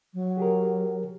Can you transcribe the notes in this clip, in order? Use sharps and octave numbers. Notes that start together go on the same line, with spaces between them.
F#3
G4 G#4 A#4